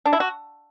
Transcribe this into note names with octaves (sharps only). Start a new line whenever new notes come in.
D4
E4
F#4